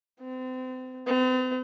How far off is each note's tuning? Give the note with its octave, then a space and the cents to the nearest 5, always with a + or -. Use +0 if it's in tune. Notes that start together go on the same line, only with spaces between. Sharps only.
C4 -35
C4 -45